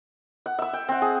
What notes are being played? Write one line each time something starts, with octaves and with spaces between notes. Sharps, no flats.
F#5
E5 E6
G5
C4 F#5
G#4